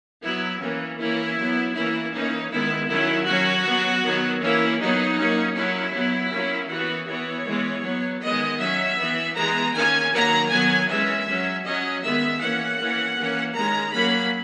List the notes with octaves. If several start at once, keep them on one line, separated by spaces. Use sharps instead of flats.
F#3 B3 E4
E3 A#3 C#4
E3 A#3 C#4 E4
F#3 B3
E3 A#3 C#4 E4
E3 A#3 C#4 D#4
D#3 G#3 B3 E4
D#3 F#3 C#4 E4
F#3 C#4 F#4
F#3 B3
D#3 F#3 B3
E3 A#3 C#4 E4
F#3 B3 D#4
F#3 A#3 C#4
F#3 C#4 E4
F#3 B3
F#3 A#3 C#4
E3 B3 F#4
E3 B3 C#5
E3 G#3 B3
F#3 B3
D#3 G#3 B3 D#5
F#3 C#4 E5
E3 B3
E3 G#3 B3 A#5
D#3 A#3 C#4 G#5
D#3 F#3 A#3 A#5
D#3 F#3 B3 G#5
E3 G#3 C#4 E5
F#3 C#4
F#3 C#4 D#5
D#3 G#3 B3 E5
E3 A#3 C#4 F#5
E3 A#3 C#4
E3 A#3 C#4
D#3 G#3 C#4 A#5
F#3 A#3 C#4 B5